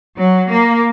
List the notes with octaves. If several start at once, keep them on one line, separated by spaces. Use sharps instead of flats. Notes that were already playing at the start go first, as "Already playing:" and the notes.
F#3
A#3